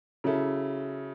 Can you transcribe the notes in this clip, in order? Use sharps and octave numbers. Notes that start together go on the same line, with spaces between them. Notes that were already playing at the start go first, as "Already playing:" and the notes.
C#3 F#3 C#4 E4 A4